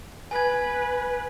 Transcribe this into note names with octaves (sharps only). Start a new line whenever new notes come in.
B4 G#5 G#6